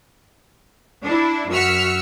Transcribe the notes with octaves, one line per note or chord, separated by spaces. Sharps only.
D4 E4
F#2 F#4 E6 F6 B6 C#7